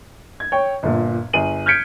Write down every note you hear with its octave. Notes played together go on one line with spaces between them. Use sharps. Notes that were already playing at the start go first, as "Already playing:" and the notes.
G#6
C#5 G5
G1 A#2
G1 G#4 D#7 F#7
F6 G6 G#6 B6 C#7 D7